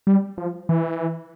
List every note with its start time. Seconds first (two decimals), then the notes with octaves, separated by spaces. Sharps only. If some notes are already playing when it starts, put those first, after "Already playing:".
0.07 G3
0.38 F3
0.69 E3